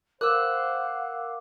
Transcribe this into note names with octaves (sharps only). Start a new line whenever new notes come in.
A#4 C5 F5 F#5 D6 E6 F#6